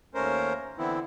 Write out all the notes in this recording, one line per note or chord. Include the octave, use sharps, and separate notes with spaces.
D#2 A3 C#4 A#4 C5
D3 E3 B3 C4 E4